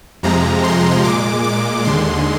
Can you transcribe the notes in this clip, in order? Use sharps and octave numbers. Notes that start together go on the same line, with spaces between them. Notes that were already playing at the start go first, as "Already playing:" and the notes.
F2 C3 F3 G#3 A#5
C6
A#2 G#3 D6
D6
D#2 D3 G#3 C6